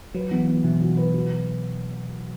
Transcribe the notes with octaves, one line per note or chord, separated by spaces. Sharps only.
F#3 B4
E3 B3
B3
B2 E3
F#4
B4
F#4